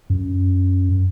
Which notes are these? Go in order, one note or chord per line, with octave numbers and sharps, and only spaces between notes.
F#2